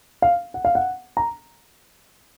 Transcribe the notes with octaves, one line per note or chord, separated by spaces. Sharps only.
F5
F#5
F5
F#5
A#5